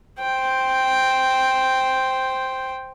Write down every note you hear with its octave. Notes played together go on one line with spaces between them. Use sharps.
C5 G5